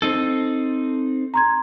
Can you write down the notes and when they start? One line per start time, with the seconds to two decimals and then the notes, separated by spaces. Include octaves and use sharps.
0.02 C4 D#4 A4 E6
1.34 A#5 C6 G#6